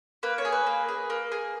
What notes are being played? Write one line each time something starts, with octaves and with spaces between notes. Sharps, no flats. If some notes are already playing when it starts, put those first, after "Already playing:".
A#3 B4
C#5
G#4
B4
A#3
G#4
A#3
G#4